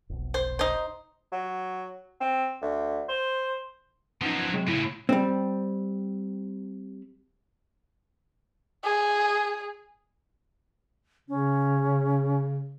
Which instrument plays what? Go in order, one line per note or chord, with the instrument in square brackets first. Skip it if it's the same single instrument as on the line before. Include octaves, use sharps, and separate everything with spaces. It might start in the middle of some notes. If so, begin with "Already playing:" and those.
[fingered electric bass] F1 B1
[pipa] C5
D#4 C5
[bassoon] F#3
C4
D2
C5
[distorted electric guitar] F3 F#3 [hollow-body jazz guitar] B3 C#4 D#4
[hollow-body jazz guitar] C3 F#3 G#3
[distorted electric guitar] A2 C#3 [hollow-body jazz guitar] E4
[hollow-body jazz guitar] G3 C4
[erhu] G#4
[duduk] C#3 [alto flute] C#4